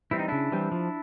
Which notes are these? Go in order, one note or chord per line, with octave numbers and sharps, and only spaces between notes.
E3 G3 C4 E4
D#4
C#3 D4 E4
E3 G3 C4
F3